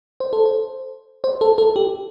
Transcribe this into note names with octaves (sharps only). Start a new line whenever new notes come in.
C5
A4
C5
C5
A4
A4
G4